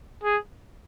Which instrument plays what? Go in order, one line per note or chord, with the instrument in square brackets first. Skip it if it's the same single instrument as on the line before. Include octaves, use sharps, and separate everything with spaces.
[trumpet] G#4